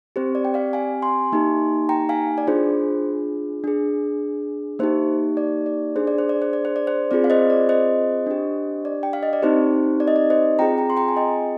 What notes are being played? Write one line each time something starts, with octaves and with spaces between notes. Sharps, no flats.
C4 G4 C5
D5
G5
D5 F5
F5 G#5
G#5 C6
A#3 D#4 G4
G5 A#5
F5 G#5
D5
D4 F4 G#4 C5
D4 G#4
A#3 D#4 G4 C5
D5
D5
D4 G#4 C5
D5
C5
D5
C5
D5
C5
D5
C5
C4 F4 G#4 D5
F5
C5 D#5
D5
C5 D#5
D4 G4
D5
G5
F5
D#5
D5
C4 D#4 G4 C5
D5
D#5
D5
C5 D#5
C4 F4 G#4 G5 A#5
G5 A#5
C6
G5 A#5
G#5
D#5 G5